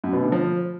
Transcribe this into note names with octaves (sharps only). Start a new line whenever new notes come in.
F#2
B2
D3
F3